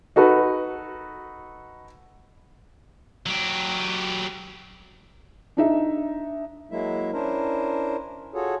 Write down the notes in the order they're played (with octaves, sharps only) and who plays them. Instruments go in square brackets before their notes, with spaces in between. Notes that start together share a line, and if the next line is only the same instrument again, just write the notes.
[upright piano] D#4 F#4 A4 B4
[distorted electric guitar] F#3 G4
[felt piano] D4 D#4 E5
[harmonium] F#3 G#3 A#3 E4 E5
C#4 D4 E4 A#4 C5
F4 F#4 G#4 A4 C#5